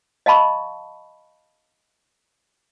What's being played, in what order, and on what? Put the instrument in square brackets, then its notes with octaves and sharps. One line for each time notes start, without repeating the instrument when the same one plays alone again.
[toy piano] D#5 F5 A5 B5 C#6